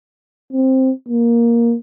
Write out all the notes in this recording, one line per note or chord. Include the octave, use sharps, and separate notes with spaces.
C4
A#3